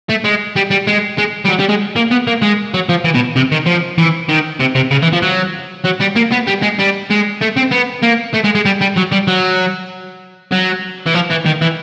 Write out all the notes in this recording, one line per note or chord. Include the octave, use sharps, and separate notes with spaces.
A3
G#3
G3
G3
G#3
G#3
G3
F#3
G3
G#3
A#3
B3
A#3
G#3
F#3
F3
E3
B2
C3
D#3
F3
E3
D#3
C3
C3
C#3
E3
F3
F#3
F#3
G3
A#3
B3
G3
G#3
G3
G#3
A3
C4
B3
A#3
A3
G#3
G#3
G3
G3
F#3
G3
F#3
F#3
E3
F3
E3
D#3
E3